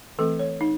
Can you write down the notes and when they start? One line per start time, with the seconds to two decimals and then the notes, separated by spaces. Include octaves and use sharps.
0.19 E3 A3 C4 A4
0.39 C#5
0.61 D#4